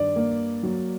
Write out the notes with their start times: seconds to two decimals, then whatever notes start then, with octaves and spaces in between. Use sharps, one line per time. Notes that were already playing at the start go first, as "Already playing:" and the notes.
Already playing: G2 D#3 D5
0.16 A#3
0.63 F#3